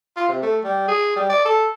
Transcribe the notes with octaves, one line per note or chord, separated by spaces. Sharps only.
F4
C3
A3
G3
G#4
G3
D5
A4